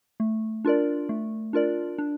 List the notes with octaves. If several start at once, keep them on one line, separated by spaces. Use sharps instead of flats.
A3
D4 F4 A#4 D5
A3
D4 F4 A#4 D5
D4